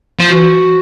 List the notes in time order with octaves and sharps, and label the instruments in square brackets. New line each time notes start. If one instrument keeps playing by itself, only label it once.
[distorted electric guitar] F3
[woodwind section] F#4